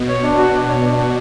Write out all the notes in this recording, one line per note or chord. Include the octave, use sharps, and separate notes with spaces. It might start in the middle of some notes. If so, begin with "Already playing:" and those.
Already playing: B2
C#5
D4
F#4
D4
C#5
D4
F#4